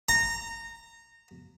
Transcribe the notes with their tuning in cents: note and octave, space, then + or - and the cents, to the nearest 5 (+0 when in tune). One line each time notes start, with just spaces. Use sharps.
A#5 -20